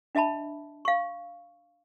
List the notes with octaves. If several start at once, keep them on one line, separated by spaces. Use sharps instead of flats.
D4 D#5 E5 A5 B5
F5 C#6